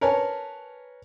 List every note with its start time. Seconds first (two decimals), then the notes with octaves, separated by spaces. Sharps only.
0.01 A#4 B4 C#5 G#5 A5